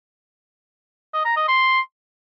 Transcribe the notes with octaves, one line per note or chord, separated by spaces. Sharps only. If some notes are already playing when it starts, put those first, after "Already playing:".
D#5
A#5
D#5
C6